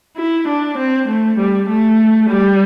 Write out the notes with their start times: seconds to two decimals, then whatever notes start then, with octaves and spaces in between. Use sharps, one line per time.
0.17 E4
0.48 D4
0.77 C4
1.08 A3
1.38 G3
1.69 A3
2.30 G3